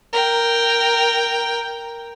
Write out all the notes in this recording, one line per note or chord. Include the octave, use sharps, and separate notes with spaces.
A#4 G5